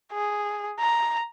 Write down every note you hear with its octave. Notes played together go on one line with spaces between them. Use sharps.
G#4
A#5